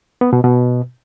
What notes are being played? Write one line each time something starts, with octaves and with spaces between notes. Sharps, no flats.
B3
B2
B2